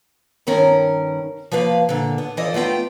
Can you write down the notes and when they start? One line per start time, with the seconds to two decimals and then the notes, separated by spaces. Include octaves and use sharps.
0.47 G2 D#3 C#4 A#4 B4
1.52 F3 A#3 B4 F5
1.89 A#2 D3
2.18 B3
2.37 E3 F3 A4 D5 D#5
2.54 A3 B3 F4 G5